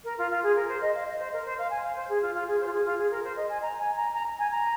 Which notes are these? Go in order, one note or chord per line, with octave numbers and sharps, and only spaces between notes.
A#4
F4
F4
G#4
A#4
C5
D#5
F5
D#5
C5
A#4
C5
F5
G#5
F5
C5
G#4
F4
F4
G#4
C5
F4
G#4
F4
G#4
A#4
C5
D#5
G#5
A#5
G#5
A#5
A#5
G#5
A#5